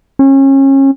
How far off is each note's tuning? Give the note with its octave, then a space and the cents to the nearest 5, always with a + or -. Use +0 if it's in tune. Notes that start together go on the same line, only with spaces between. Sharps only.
C#4 -30